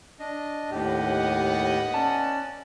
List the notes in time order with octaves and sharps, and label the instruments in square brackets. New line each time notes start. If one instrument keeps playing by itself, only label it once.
[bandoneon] D4 D#5
[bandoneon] D#2 A2 G4 [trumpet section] B3 D#5 F#5
[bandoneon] C#4 D5 [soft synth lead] A5